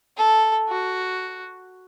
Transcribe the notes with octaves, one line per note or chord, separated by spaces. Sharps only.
A4
F#4